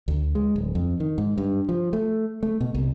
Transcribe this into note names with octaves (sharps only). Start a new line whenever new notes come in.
D2
G#3
D1
F2
D#3
G#2
G2
F3
A3
A3
B2
C2